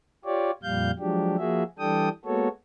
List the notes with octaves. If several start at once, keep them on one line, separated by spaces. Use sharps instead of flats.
F4 G4 C#5 D5
F2 A#2 G3 F5 G6
F3 F#3 G#3 D4 G4
F3 A#3 F#4 G#4 E5
E3 G3 D4 A4 G5 D#6
G#3 A#3 B3 F#4 A4 C#5